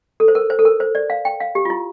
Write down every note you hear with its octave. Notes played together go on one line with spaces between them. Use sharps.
A4
C5
A#4
C5
A4
A#4
C5
D5
F5
G5
F5
G4
F4
E4